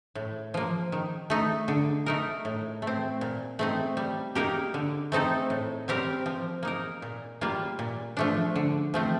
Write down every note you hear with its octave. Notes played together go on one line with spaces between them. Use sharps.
A2
F3 A#3
D#3
A3 D#4
D3
A3 D#4 A#4
A2
A3
C4
A#2
A3 C4 D#4
G3
A#3 D#4 G4 A#4
D3
A3 C4 D#4 A4
A2
G3 C4 G4 A#4
F3
A#3 D#4 A#4
A#2
G3 A#3 F4
A#2
F3 A3 D4
D3
F3 A3 C4